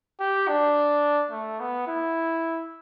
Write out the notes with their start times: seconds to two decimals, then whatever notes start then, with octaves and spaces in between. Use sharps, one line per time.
0.20 G4
0.48 D4
1.31 A3
1.60 B3
1.88 E4